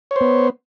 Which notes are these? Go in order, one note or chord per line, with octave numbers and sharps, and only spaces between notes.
B3 C5 C#5